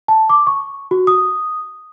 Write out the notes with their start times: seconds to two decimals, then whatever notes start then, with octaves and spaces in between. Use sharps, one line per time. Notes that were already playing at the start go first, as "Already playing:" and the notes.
0.08 A5
0.29 D6
0.47 C#6
0.91 F#4
1.07 D#6